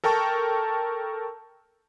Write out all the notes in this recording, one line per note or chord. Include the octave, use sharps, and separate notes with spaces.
A4 A#4 G5 A5 C#6